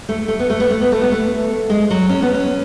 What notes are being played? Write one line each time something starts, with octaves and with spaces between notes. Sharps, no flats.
A3
A3
B3
A3
B3
A3
B3
A3
B3
A3
G#3
F#3
C#4
B3
C#4